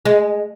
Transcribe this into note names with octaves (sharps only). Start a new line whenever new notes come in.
G#3